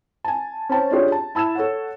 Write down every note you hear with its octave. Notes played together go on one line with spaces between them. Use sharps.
G#5 A5
C#4 C5 C#5 G5 A5
C#4 D4 F4 G4 G#4 C#5
A5
E4 A5 E6 G#6 E7
A4 C#5 F#5